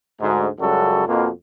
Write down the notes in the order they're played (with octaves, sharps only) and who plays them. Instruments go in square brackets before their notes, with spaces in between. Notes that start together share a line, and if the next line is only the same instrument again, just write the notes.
[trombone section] D2 G#2
C#2 F#2 C#3 G3 F#4 A4
F2 B2 A#3